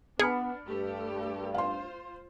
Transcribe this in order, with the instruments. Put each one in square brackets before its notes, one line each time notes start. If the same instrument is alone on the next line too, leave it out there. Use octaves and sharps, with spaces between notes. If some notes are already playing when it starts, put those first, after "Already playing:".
[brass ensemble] B3 [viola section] D4 [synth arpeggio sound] G#4 [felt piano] B5 F6 C#7
[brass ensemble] G2 [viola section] A3 G4 A4
[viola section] F4 C5 [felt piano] F5 C6